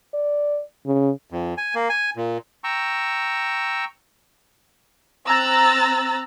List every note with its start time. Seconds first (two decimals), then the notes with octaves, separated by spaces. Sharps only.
0.14 D5
0.86 C#3
1.30 F2
1.58 G#5
1.75 A#3
1.90 G#5
2.16 A#2
2.64 G5 A#5 C#6 E6
5.26 C4 A#5 E6 F#6 A6